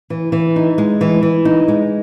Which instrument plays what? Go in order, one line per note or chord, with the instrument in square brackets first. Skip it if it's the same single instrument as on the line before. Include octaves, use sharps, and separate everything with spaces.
[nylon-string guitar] E3
E3
D#4
G#3
E3
E3
D#4
G#3